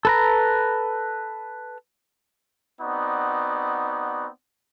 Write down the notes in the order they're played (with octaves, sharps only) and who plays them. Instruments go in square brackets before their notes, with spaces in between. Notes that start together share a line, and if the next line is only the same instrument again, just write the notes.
[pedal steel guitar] A4 B4 A#5
[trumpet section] B3 C4 D#4 F#4 D5